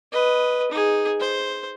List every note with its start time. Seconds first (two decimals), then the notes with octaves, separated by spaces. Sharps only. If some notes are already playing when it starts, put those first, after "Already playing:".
0.12 B4 D#5
0.71 D#4 G#4
1.20 C5